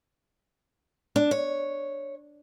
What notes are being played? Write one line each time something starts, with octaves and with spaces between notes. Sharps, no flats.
D4
C#5